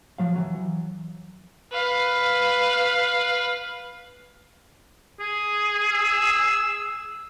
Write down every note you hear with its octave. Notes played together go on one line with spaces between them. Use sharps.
F3 F#3 F5
E3 F#3
B4 F5
G#4
E6